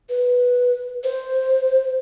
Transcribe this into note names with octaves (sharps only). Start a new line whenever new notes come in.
B4
C5